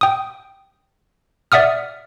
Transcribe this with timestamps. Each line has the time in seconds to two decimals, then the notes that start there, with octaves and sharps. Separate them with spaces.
0.01 G5 D#6
1.52 D5 E5 F#5 D#6 F6